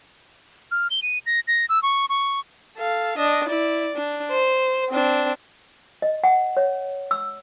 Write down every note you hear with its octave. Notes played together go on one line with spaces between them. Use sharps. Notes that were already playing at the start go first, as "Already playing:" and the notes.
F6
G7
D#7
A#6
A#6
E6
C#6
C#6
A4 F5
D4 D#5
E4 D5
D4
C5
C4 D4
D#5
F#5
C#5
E6